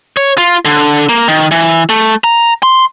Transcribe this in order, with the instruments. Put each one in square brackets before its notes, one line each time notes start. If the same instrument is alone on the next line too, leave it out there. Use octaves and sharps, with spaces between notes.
[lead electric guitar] C#5
F4
D3
A#3
D#3
E3
A3
A#5
C6